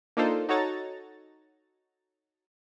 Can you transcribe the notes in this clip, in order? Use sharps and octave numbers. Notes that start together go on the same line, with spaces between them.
A#3 D4 D#4 F4 A4 C5
D#4 F#4 A4 C#5 A#5 A6